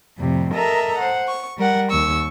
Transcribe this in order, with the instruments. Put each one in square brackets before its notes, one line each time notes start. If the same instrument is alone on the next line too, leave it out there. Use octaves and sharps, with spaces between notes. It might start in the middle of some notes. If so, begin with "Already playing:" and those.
[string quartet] F2 A2 C3 G3
A4 A#4 D#5 E5 A#5
C5 F#5
C#6
G3 A#4 F#5
D#2 C#6 E6